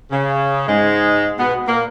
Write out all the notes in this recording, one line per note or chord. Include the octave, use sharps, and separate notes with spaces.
C#3
G#2 G#3
B2 B3
A#2 A#3